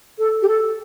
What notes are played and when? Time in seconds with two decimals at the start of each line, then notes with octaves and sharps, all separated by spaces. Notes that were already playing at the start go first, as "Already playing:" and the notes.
0.18 A4
0.42 G4
0.48 A4